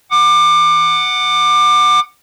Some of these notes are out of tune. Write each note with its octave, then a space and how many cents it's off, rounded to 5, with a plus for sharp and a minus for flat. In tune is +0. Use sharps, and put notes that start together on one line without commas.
F#5 +0 D6 +25